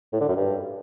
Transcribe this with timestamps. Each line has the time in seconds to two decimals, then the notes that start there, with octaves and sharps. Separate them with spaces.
0.13 A2
0.21 D3
0.29 F#2
0.36 G2